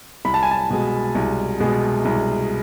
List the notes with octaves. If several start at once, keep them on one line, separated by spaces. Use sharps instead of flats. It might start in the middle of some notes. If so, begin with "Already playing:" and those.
C2 B5
A5
G#5
A5
B2 G#3
C2
B2 G#3
C2